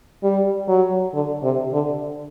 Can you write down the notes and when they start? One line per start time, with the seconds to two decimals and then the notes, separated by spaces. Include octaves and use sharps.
0.23 G3
0.68 F#3
1.13 D3
1.43 C3
1.73 D3